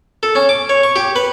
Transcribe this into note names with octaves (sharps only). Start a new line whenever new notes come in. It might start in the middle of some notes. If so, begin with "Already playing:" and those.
A4
C#4
D6
C#5
C#6
G4
B4